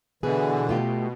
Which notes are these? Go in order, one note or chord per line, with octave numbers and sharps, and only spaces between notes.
B2 D3 E3 G#4 B4
A3 F4 G4